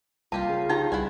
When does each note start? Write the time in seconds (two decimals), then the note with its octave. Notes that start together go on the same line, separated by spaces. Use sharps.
0.32 C2 A#3 F4 G4 F5 A5
0.49 C#3
0.69 D#4 G4 G5 A5 A#5
0.92 C2 E4 F#5 G#5